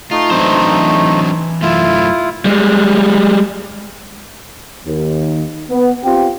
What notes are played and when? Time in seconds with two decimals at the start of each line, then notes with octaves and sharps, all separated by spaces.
0.11 A3 D#4 F4
0.31 E3 F#3 C4 D4 C5
1.62 F#2 A3 E4 F4
2.45 G3 G#3
4.86 D#2
5.71 B3
6.04 C4 F4 G4